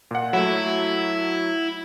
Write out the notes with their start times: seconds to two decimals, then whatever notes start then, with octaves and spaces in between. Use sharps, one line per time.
0.11 A#2 F#5
0.33 F#3 A3 E4